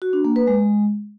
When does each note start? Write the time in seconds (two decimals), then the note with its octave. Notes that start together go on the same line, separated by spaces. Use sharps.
0.02 F#4
0.13 D4
0.25 A#3
0.36 B4
0.47 G#3